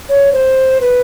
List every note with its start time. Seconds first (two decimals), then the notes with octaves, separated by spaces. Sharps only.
0.09 C#5
0.32 C5
0.81 B4